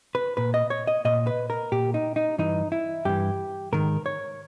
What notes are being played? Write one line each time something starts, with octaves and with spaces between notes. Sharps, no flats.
B4
A#2 B4
D#5
C#5
D#5
A#2 D#5
B4
A#4
A#2 G4
D#4
D#4
G2 E3 D#4
E4
G2 E3 G4
G#2 D#3 A#4
C#5